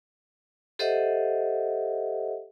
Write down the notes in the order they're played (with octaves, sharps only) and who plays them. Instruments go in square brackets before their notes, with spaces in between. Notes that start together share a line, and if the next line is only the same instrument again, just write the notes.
[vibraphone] G4 A4 C5 D#5 E5 F#5